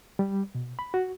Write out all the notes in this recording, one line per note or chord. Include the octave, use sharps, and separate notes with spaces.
G3
B2
B5
F#4